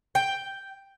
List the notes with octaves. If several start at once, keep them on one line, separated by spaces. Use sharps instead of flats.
G5